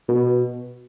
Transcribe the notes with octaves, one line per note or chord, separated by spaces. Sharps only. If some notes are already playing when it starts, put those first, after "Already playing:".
B2